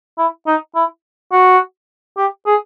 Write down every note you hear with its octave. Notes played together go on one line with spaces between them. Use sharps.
E4
D#4
E4
F#4
G4
G#4